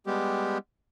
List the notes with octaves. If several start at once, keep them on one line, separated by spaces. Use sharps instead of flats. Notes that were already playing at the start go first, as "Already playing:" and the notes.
G3 G#3 B3 G4